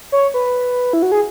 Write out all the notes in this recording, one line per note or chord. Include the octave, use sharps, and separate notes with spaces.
C#5
B4
E4
F#4
G#4